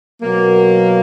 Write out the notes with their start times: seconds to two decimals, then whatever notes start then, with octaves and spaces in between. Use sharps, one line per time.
0.22 B2 F#3 A#3